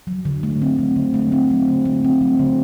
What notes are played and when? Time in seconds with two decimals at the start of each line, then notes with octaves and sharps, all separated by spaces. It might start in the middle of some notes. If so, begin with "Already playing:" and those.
0.07 F#3
0.25 D3
0.43 A3
0.61 C4
0.79 F#3
0.96 D3
1.14 A3
1.32 C4
1.50 F#3
1.68 D3
1.85 A3
2.04 C4
2.21 F#3
2.39 D3